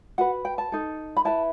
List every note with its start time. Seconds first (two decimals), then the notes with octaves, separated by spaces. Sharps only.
0.18 F#4 B4 F#5
0.45 G5
0.58 A5
0.72 D#4 A4
1.17 B5
1.25 E4 B4 A5